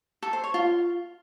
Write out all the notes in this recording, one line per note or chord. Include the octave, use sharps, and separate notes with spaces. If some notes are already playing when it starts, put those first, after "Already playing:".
A4
C5
C#5
F4